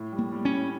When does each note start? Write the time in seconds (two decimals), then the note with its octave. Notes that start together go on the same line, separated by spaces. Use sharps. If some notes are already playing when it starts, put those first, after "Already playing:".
Already playing: A2
0.12 G3
0.19 A#3
0.32 G3
0.45 C#4
0.52 A2